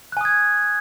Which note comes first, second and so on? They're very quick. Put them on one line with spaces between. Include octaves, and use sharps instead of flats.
F#6 G#5 D#6 G#6